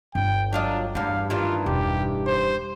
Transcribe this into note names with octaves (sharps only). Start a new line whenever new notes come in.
G1 G5
F#3 D4 F4 D#5
E2 G2 A3 F5
G2 D#3 E3 F4
E1 G4
C5